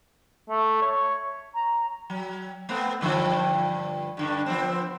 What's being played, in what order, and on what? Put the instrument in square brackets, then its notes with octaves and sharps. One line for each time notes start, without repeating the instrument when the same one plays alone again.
[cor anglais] A3
C#5
[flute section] A#5
[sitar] F#3
A3 B3 C4
G2 D3 F3
G2 D3 D4
F3 B3 C4